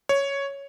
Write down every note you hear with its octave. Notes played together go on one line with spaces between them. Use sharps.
C#5